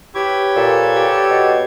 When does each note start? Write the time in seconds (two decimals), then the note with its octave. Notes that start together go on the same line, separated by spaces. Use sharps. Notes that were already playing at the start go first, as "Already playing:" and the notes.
0.15 E4 G4 B4 C#5 G#6
0.56 A#2 A4
0.96 G4
1.30 B2